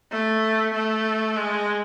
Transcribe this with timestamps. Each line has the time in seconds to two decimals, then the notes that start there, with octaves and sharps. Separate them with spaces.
0.11 A3
0.74 A3
1.36 G#3